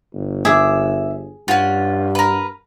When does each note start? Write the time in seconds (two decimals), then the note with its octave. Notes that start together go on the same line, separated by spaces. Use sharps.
0.14 G1
0.45 G#4 E5 D6
1.48 G2 C#4 F4 F#5
2.15 A#4 B4